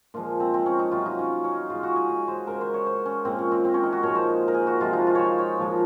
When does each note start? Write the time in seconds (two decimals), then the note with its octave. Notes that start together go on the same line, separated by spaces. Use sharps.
0.14 A#2 F3 G#3 F4
0.40 C4
0.54 C4
0.66 C#4
0.79 D#4
0.92 C3 F#3 F4
1.06 D#4
1.19 C#4
1.44 C#4
1.57 F4
1.70 C#3 G#3 F4
1.83 F#4
1.96 G#4
2.09 G#4
2.28 C5
2.47 C#3 G#3 A#4
2.61 C5
2.74 C#5
2.87 C5
3.06 C#4
3.25 A#2 G#3 C4
3.39 C#4
3.52 C4
3.65 C4
3.74 C#4
3.83 D#4
3.93 F#4
4.03 A#2 F3 G#3 C#5
4.16 C5
4.48 A#4
4.54 G#4
4.67 F#4
4.80 C3 F3 G#3 F4
4.93 D#4
5.07 F4
5.15 C5 C#5
5.39 C#5
5.58 A#2 F3 G#3